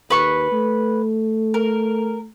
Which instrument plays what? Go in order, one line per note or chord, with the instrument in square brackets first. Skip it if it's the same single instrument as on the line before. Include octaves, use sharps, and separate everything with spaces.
[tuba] D#2 [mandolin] B4 C#6
[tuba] A3
[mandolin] A#4